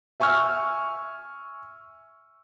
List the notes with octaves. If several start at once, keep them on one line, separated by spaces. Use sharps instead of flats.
E5 G#5 C#6 E6 F6